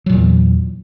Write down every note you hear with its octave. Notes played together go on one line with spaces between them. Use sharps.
E2 A#2 F#3